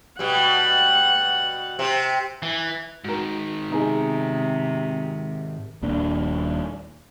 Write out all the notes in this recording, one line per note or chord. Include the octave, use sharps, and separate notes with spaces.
B2 G3 F#5
C3
E3
G#2 D#3 F#4 A#4
C3 B3 D#4 G#4
D#1 A#2 D4